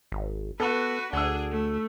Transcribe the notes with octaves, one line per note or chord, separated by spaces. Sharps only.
G#1
B3 F#4 A4 B4
D2 D4 G#4 F#5 E6
A3